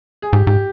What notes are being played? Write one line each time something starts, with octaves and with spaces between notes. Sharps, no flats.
G#4
G#2 G4
G#2 G4